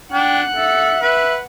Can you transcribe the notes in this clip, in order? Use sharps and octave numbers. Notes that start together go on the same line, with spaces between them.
D4 F#5 G5 F#6
A4 E5
B4 E5